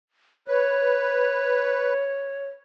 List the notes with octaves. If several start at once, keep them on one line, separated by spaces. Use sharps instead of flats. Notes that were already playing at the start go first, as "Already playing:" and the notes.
B4 C#5